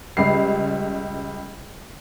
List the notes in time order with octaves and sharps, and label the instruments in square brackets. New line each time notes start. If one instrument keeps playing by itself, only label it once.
[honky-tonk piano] C#2 G3 C7